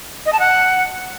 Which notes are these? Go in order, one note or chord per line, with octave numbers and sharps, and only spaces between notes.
D#5
A5
F#5